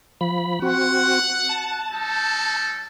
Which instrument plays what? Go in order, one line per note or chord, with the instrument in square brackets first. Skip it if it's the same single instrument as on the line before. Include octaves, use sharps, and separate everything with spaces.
[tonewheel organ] F3 B5
[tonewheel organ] C4 F#4 [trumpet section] F#5
[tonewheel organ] A5
[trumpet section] G3 D#4 A4